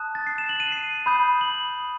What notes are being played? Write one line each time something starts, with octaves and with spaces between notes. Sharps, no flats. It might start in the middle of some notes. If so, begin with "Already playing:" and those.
Already playing: A5 D#6 F#6
A6
C7
E7
F#7
D#7
C7
B5 D#6 G6
F#7